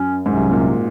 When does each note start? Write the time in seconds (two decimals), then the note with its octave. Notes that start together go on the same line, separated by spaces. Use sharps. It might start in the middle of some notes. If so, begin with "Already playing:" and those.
Already playing: F#2 C#4
0.26 C2 G#2 C3 F#3 C#4
0.52 A#2